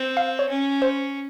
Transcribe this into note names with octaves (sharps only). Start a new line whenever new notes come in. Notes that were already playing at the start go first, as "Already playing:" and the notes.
Already playing: C4
F5
C#5
C#4
C5